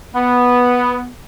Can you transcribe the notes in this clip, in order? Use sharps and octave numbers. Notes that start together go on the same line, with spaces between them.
B3